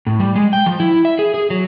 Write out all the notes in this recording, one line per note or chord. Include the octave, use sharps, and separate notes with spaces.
A2
G3
G#3
G5
F3
E4
E5
G#4
G#4
F#3